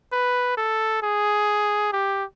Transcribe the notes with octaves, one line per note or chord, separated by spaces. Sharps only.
B4
A4
G#4
G4